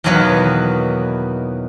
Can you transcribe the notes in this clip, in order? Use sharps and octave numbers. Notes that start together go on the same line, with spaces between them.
E2 B2 D#3 F#3 A#3 B3